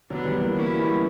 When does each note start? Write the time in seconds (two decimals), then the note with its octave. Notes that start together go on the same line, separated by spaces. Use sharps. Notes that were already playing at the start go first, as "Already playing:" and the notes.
0.10 D3 F#3 B3 D4
0.26 E3 G3
0.41 F#3 A#3
0.56 F#3 A#3 C#4 E4
0.79 G3 B3